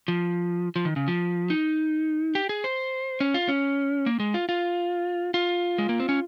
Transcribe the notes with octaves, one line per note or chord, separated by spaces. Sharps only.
F3
F3
D#3
C#3
F3
D#4
G4
G#4
C5
C#4
F4
C#4
A#3
G#3
F4
F4
F4
G#3
A#3
C4
C#4